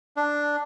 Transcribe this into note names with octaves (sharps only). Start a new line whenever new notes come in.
D4